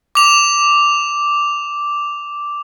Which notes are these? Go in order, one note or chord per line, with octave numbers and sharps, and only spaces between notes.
D6 F7